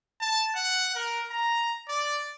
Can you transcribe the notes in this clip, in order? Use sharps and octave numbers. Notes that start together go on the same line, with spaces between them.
A5
F#5
A#4
A#5
D5